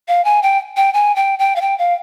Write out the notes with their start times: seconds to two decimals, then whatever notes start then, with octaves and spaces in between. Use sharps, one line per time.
0.08 F5
0.25 G#5
0.43 G5
0.77 G5
0.94 G#5
1.16 G5
1.39 G5
1.56 F5
1.61 G5
1.78 F5